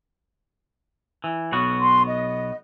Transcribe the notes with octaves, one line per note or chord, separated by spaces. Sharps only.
E3
B1 B3 F#4
C6
D#5